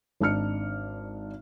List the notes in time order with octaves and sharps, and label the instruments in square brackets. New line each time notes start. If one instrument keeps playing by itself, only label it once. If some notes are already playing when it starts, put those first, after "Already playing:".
[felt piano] G#1 D4 D#4 F6 C#7